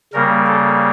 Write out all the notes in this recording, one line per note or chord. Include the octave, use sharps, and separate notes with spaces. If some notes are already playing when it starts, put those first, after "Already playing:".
C#3 G3 A#3 A#4
A4